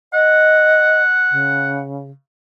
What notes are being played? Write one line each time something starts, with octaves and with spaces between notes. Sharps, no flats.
D#5 F#5
C#3